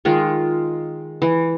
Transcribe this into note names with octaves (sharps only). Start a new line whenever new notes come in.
D#3 G#3 F4
E3